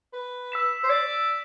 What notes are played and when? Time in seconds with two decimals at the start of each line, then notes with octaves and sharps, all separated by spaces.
0.13 B4
0.52 E6 B6 E7
0.83 C5
0.90 D5